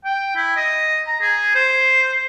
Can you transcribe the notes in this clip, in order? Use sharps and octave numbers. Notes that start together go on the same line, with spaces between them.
G5
E4
D#5
A#5
G#4
C5